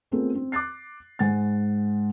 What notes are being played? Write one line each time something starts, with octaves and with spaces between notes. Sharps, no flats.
A3 B3 C4 F4 G#4 A#4
C4
D6 F#6 A6 C7
G#2 F#5 G#5 A6